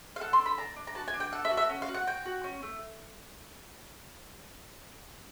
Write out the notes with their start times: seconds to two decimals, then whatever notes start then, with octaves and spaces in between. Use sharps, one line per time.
0.16 F5
0.20 A4 F#5
0.33 C6
0.39 D4
0.46 B5
0.58 D4 A#5
0.76 D4
0.87 A#5
0.95 F#4 A5
1.08 G#5
1.14 D4
1.20 G5
1.32 A4 F#5
1.45 E5
1.51 F#4
1.57 E5
1.69 C#4
1.82 F5
1.88 F#4
1.94 F#5
2.07 F#4 G5
2.25 F#4
2.44 C#4
2.63 A3